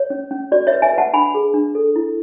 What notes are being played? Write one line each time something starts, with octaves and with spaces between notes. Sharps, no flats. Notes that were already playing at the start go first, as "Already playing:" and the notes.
Already playing: C#5
C#4
C#4
F#4 D5
C#5 E5
B4
E5 G#5
B4 F#5 A5
D4 G#5 B5
G#4
D4
A4
E4